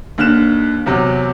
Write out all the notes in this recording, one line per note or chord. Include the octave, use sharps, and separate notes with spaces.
D#2 D3 F6 F#6 E7
E2 C3 F#3